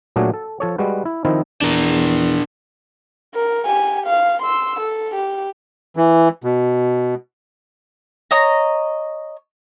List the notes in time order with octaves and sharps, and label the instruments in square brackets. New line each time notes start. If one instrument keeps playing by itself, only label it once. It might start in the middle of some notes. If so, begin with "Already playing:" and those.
[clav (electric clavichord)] A#2 F#3 A3 D4 F#4 G#4
A4
F3 A4 C#5
G3 G#3 F#4 B4
E4
D#3 F3 C4 D#4 E4
[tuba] E2 [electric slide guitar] D4 A#4
[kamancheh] A#4
G4 G#5
F5
C6 E6
A4
G4
[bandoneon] E3
B2
[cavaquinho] C#5 D#5 A#5